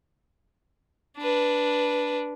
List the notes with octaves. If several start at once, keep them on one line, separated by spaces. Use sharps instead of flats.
D4 B4